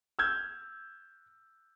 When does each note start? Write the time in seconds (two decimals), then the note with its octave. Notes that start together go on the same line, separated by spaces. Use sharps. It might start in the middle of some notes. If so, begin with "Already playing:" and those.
0.19 E6 F6 G6 G#6